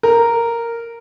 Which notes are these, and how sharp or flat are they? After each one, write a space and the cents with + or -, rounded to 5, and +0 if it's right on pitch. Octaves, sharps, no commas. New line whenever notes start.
A#4 -5